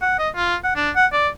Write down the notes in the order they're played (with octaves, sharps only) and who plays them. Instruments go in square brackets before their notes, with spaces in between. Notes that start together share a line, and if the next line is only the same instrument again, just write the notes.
[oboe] F#5
D#5
F4
F#5
D4
F#5
D5